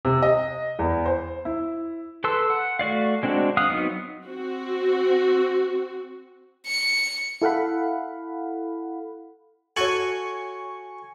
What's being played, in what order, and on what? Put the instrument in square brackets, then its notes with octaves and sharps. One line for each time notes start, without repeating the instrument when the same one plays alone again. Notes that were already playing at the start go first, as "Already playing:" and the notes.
[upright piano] C3
D#5
E2
C5
E4
[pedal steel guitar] A4 B4 A5 C6 E6
F#5
A3 F#4 D5 F5
G#3 C4 D4 F#4
F5 F#5 D#6
F#3 B3 C4 D#4
[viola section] C4 F#4
[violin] C#7
[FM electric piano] E4 A4 F5 F#5 B5
[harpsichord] F#4 A4 [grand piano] C#5 F#7 [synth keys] G#5 C#6